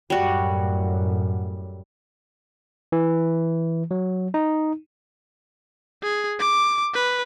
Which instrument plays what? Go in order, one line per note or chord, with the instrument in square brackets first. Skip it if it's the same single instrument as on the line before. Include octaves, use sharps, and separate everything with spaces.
[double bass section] F#2 A2 [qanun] G3 F#4
[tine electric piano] E3
F#3
D#4
[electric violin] G#4
D6
B4